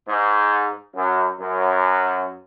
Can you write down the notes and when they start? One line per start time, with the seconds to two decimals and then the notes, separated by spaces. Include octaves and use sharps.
0.08 G#2
0.97 F#2
1.40 F#2